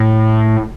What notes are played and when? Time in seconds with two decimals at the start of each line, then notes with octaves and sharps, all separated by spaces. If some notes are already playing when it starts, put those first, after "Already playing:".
Already playing: A2